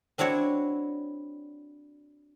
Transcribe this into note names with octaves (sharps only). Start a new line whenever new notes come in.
C4 D4 E4 F#4 C#5